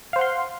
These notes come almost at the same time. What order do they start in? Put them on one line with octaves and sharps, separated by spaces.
F5 C5 F#5 C6